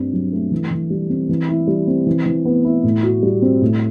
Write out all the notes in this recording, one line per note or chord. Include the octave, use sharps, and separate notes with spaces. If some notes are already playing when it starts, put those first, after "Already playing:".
Already playing: G2 C4
F#3
A3
E3
E3
G3
C4
E3
E4
G3
C4
E3
E3
B3
E4
A2
F#4
G3
C4
A2